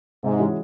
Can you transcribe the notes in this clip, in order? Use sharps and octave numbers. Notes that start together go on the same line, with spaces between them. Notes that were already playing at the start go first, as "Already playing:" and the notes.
G#2 C3
E3 G#3 C#4 F#4